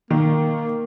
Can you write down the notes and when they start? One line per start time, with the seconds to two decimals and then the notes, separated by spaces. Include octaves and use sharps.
0.11 D#3 A#3